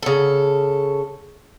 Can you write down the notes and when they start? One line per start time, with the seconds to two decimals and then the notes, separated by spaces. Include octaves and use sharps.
0.02 C#3 A4